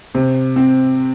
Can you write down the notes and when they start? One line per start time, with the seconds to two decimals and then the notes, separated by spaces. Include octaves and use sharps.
0.15 C3
0.56 C4